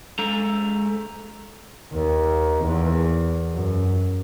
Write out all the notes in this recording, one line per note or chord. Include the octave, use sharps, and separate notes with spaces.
G#3 A4 A#5
D#2
E2
F#2